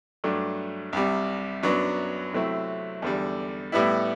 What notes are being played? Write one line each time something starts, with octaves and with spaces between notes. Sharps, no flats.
G2 F#3 A3 D4
C2 C3 G3
F#2 F#3 B3 D4
C3 F#3 A3 C4 E4
E2 D3 G3
A2 G3 B3 E4